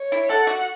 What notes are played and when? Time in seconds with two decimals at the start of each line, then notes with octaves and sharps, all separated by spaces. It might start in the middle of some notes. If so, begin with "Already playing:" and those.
Already playing: C#5
0.12 E4
0.29 A4 F#5
0.47 F#4